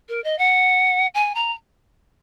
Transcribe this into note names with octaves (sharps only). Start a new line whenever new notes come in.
A#4
D#5
F#5
G#5
A#5